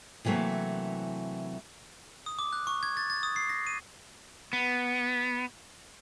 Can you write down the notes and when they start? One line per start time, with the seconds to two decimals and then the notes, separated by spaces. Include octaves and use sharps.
0.25 C3 E3 F#3 A3 A#3
2.26 D#6
2.39 D6
2.53 F#6
2.67 C#6
2.83 G#6
2.97 A6
3.10 A6
3.23 D#6
3.36 C7
3.49 A#6
3.67 D#7
4.53 B3